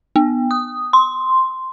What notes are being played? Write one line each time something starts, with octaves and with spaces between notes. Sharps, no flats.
B3
D#6
C6